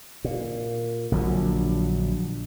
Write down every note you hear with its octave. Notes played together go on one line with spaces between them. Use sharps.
A#2
A#1 D3 F#3